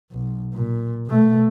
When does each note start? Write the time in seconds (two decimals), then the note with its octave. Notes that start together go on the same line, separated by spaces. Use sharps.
0.12 B1
0.54 A#2
1.07 B2 A3